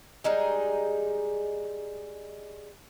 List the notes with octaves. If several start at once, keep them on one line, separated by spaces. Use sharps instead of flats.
G3 G#3 D#4 G#4